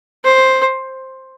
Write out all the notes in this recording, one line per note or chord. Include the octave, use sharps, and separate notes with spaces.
C5